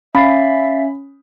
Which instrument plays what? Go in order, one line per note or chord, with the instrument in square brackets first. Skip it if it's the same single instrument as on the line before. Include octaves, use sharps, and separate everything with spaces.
[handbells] C#4 [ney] E5 [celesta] F5 A6 C7 [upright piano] B5